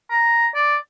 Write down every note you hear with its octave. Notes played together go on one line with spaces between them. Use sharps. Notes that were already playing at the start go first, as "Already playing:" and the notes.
A#5
D5